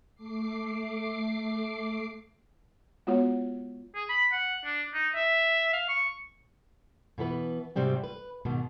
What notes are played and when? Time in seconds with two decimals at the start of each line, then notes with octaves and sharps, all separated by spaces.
0.15 A3 D6 C7
3.07 G#3 B3 F4 F#4 C#5 F#5
3.95 G#4
4.09 B5
4.32 F#5
4.65 D4
4.94 D#4
5.15 E5
5.73 F5
5.89 C#6
7.18 B2 E3 B3 B4
7.76 G#2 C3 G3 C4 F#4
8.04 B4
8.45 G#2 B2 D#3